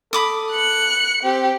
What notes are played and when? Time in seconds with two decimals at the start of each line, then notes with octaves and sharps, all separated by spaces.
0.13 A4 B5 D6 D#6
0.52 F#6 C#7
1.23 C4 G4